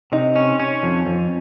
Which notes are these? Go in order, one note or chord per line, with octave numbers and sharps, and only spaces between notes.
C3 D#4
C#4
C#4
F2
F2